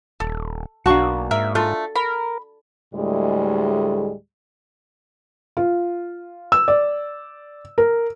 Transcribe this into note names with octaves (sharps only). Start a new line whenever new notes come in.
D#1 A4
B1 A#3 D4 F#4 A5 C#6
G#2 A#4 E5
A3 D4 F4 A4
A#4 B5
D2 A2 G3 G#3
F4
E6
D5
A#4